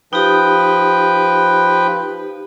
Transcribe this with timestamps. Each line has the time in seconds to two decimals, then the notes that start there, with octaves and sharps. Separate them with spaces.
0.13 F3 D#4 G4 B4 G5